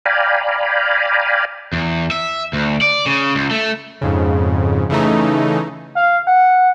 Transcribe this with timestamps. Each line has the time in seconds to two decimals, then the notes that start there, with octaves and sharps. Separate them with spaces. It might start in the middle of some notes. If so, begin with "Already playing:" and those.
0.06 D5 F5 G5 G#5 A#5 B5
1.73 E2
2.11 E5
2.53 D2
2.81 D5
3.06 C#3
3.35 C#2
3.51 A3
4.01 F2 G#2 C#3
4.90 C#3 E3 A3 D#4
5.96 F5
6.28 F#5